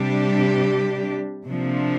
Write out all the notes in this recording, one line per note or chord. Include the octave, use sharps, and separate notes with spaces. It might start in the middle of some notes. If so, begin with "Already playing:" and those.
Already playing: C3 G3 D4 G4
C3 F3 A#3 D4